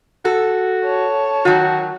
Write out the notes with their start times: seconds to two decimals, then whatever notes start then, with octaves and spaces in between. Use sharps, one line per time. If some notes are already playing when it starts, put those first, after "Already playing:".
0.25 F#4 A4
0.84 C#5 A5
1.45 D#3 F#3 F#4